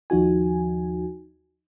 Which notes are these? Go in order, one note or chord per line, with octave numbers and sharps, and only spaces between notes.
D#2 F3 D#4 F#4 G#5